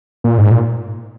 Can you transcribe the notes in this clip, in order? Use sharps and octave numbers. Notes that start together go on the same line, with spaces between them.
A#2
G#2
A#2